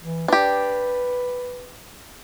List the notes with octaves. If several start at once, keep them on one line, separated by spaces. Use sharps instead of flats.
E3
D4 G4 B4